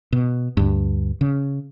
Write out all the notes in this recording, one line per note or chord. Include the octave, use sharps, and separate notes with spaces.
B2
D2 G2
C#3